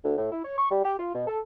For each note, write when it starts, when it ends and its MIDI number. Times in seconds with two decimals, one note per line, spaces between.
0.04 0.17 38
0.17 0.31 45
0.32 0.42 64
0.44 0.56 73
0.58 0.69 85
0.70 0.82 55
0.85 0.96 67
0.99 1.11 65
1.14 1.24 47
1.28 1.39 69